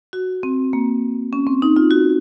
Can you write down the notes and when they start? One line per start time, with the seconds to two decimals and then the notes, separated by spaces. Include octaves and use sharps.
0.13 F#4
0.43 C4
0.73 A#3
1.33 C#4
1.47 C4
1.62 D#4
1.77 F4
1.91 F#4